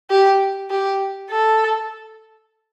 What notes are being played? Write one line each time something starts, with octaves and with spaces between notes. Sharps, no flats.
G4
G4
A4